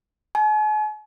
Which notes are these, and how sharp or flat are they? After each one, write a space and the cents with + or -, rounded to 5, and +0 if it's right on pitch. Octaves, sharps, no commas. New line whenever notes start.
G#5 +45